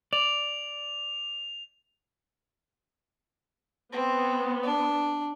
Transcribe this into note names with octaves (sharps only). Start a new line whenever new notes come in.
D5 F7
B3 C4
D4